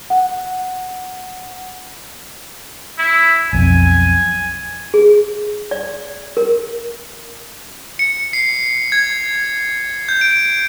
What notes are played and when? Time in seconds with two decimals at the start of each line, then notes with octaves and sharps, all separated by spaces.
0.10 F#5
2.98 E4
3.53 B1 F2 G#5
4.94 G#4
5.71 D5
6.37 A#4
7.99 C#7
8.33 C7
8.92 G#6
10.09 G6
10.21 D7